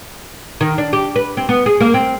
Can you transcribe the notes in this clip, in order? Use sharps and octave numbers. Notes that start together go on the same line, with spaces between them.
D#3
D4
G4
B4
C4
B3
G#4
A#3
C4